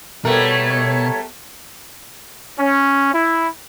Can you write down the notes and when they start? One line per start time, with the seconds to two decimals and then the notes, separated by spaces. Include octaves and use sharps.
0.25 B2 G3 A3 B3 A4 A#4 C#5
2.58 C#4
3.12 E4